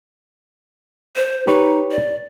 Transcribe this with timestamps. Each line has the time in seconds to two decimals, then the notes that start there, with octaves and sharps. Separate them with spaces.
1.16 C5
1.47 D#4 G4 B4 C#5
1.91 D5